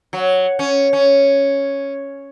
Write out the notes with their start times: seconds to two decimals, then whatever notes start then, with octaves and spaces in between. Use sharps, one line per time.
0.13 F#3
0.59 C#4
0.93 C#4